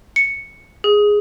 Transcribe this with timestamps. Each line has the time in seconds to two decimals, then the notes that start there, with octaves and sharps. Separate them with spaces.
0.16 C#7
0.84 G#4